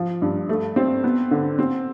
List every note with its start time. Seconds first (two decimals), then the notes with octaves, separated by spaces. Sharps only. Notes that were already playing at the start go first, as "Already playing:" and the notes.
Already playing: F3
0.22 G2
0.49 A3
0.76 C4
1.04 B3
1.31 D3
1.59 C4